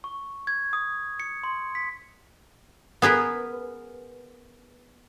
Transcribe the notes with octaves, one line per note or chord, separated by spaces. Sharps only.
C#6
G#6
D#6
C#7
C6
B6
B3 G#4 A#4 B4